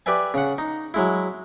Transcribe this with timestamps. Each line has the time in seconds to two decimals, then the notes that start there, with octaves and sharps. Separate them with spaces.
0.06 G4 B4 D5 E5 G#5
0.34 C#3 F#5
0.58 D#4
0.94 F#3 G#3 E4